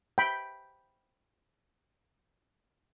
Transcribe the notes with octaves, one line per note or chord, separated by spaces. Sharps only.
G5 B5